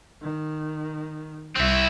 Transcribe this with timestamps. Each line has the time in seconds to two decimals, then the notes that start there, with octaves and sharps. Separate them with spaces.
0.22 D#3
1.56 C2 C4 E4